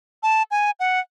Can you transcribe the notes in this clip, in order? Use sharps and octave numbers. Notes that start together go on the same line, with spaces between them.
A5
G#5
F#5